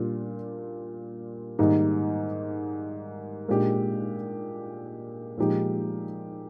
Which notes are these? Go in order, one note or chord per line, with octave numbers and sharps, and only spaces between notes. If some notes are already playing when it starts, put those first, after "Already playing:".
Already playing: A#2 G3 D4 F4
G#2 D#3 G3 A#3 D#4
A#2 G#3 D4 G4
A#2 F3 G#3 D#4 G4